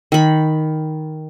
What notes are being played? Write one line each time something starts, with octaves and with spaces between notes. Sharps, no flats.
D#3 B5